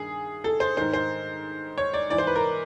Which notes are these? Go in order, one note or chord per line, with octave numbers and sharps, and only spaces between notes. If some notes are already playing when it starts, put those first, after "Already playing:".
Already playing: G2 D#3 G#4
A4
C5
G#2 D#3 C5
C5
C#5
D5
G#2 E3 D5
C5
B4
A#4